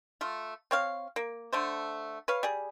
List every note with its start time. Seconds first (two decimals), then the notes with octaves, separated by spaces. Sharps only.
0.21 A3 F4
0.71 C4 C#5 F5
1.16 A#3
1.53 D3 A3 C5
2.28 B4 C#5 F5
2.43 G3 G#4